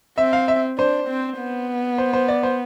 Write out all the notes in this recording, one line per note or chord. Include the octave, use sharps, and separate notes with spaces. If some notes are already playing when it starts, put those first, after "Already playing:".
C4 E5
F5
E5
D4 C5
C4
B3
C5
C5
D5
C5